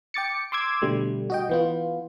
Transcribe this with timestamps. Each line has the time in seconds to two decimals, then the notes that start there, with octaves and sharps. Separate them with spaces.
0.14 G5 D6 A6 C#7
0.52 C6 D6 E6 G#6
0.82 B2 D3 G3 A3
1.30 F#4 D#5 G5
1.49 E3 B3 F4